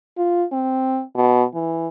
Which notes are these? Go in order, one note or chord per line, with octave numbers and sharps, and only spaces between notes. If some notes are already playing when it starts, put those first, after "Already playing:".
F4
C4
B2
E3